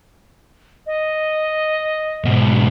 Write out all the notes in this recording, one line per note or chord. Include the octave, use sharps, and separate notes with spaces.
D#5
G#2 B2